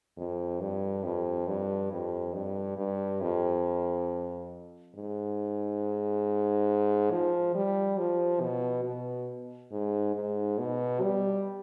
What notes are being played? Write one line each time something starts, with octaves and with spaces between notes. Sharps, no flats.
F2
G2
F2
G2
F2
G2
G2
F2
G#2
F3
G3
F3
B2
B2
G#2
G#2
B2
G3